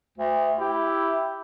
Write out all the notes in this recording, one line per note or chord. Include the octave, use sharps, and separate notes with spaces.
D2
E4 G4